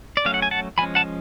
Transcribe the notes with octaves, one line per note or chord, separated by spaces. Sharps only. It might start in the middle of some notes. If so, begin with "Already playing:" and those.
D5
F#3 A3 C#4 F5
F#5
G#5
F#5 A5
F3 G#3 C#4 G#5 B5
F#5 A5